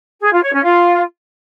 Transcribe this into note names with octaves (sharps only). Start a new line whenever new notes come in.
G#4
F4
C#5
C#4
F4